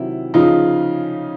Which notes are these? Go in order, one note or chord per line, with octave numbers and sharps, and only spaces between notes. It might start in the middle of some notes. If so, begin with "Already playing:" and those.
Already playing: C3 D#3 F#3 E4
C#3 F3 D#4 F4